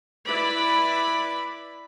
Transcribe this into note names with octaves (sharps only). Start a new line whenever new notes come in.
E4 B4 D5 B5